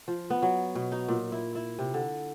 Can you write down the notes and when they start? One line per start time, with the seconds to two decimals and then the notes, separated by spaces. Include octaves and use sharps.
0.08 F3
0.30 B3
0.42 F#3
0.75 B2
0.92 D#4
1.08 A#2
1.32 E4
1.55 E4
1.79 C3
1.94 D3